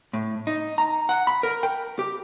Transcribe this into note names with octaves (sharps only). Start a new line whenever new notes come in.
A2
D#4
A#5
F#5
B5
A#4
G5
G4